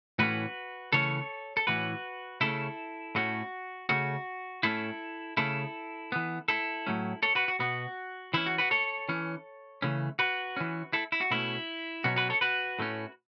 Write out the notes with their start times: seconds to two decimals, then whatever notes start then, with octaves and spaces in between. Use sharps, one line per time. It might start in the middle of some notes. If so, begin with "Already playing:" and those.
0.19 A2 E3 A3 C#4 F#4 B4
0.93 C#3 E3 A3 C#4 A4 C#5
1.57 A4
1.67 A2 E3 C#4 F#4 B4
2.41 C#3 A3 C#4 E4 A4
3.15 A2 A3 C#4 F#4
3.89 C#3 A3 C#4 F#4
4.63 A2 A3 C#4 E4 A4
5.37 C#3 A3 C#4 E4 A4
6.12 E3 B3
6.48 E4 A4
6.87 A2 F#3 A3 C#4
7.23 A4 C#5
7.35 F#4 B4
7.48 F#4
7.59 B2 B3 F#4
8.34 E3 C#4 E4
8.46 F#4
8.58 F#4 B4
8.71 A4 C#5
9.09 E3 C#4
9.82 C#3 E3 A3 C#4
10.19 F#4 B4
10.57 E3 C#4
10.93 E4 A4
11.12 E4
11.21 F#4
11.31 B2 A3 C#4 E4
12.04 B2 F#3 C#4 F#4
12.16 F#4 B4
12.30 A4 C#5
12.41 F#4 B4
12.79 A2 A3 C#4